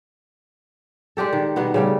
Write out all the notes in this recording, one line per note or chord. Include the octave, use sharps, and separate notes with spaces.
G#3 D4 G4 A4
D#3
B2 D#3 G3 B3
C#3 G3 A3